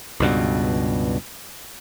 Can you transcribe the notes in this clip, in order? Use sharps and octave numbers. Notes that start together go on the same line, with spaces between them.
C#2 G2 B2